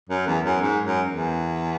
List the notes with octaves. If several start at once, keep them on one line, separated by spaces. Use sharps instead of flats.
F#2
E2
F#2
G#2
F#2
E2